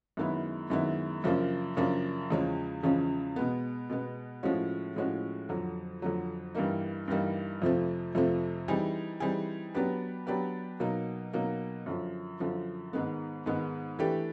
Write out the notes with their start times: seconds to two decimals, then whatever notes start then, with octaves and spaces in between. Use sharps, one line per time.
0.17 F#2 D#3 G#3 B3 E4
0.70 F#2 D#3 G#3 B3 E4
1.24 F#2 C#3 F3 A#3 D4
1.77 F#2 C#3 F3 A#3 D4
2.30 E2 C#3 F3 G#3 C#4
2.83 E2 C#3 F3 G#3 C#4
3.36 B2 G#3 B3
3.90 B2 G#3 B3
4.43 A2 F3 G#3 C#4 F#4
4.96 A2 F3 G#3 C#4 F#4
5.49 F2 D3 F#3
6.02 F2 D3 F#3
6.55 G2 E3 G3 A#3 D#4
7.08 G2 E3 G3 A#3 D#4
7.62 F2 C3 F3 A3 C4
8.15 F2 C3 F3 A3 C4
8.68 E3 G3 C4 D#4 G#4
9.20 E3 G3 C4 D#4 G#4
9.75 F#3 B3 D4 G4 B4
10.27 F#3 B3 D4 G4 B4
10.80 B2 F#3 A#3 D#4
11.33 B2 F#3 A#3 D#4
11.86 F#2 D3 F3
12.40 F#2 D3 F3
12.93 G#2 D#3 G#3 B3
13.46 G#2 D#3 G#3 B3
13.99 E3 A3 D4 G4 B4